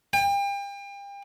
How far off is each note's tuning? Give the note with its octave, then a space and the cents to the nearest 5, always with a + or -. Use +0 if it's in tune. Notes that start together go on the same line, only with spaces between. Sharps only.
G5 +35